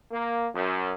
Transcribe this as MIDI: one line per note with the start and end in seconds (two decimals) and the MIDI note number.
0.11 0.46 58
0.54 0.92 42